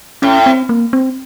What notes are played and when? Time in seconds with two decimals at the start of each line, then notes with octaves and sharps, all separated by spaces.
0.22 A2 C#4
0.46 C4
0.69 A#3
0.93 C4